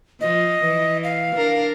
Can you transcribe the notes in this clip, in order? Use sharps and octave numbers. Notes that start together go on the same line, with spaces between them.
F3 D#5
E3
F5
D4 A#4